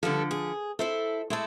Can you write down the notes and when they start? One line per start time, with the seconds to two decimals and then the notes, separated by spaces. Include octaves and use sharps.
0.03 D3 F3 G3 B3 A4
0.31 G#4
0.79 E4 A4 C5 E5
1.30 G#3 A3 E4 A4